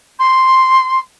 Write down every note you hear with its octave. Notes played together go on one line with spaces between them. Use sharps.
C6